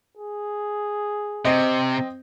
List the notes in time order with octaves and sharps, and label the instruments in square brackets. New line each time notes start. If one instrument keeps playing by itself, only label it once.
[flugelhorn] G#4
[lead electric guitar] C3 [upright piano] C4 D#5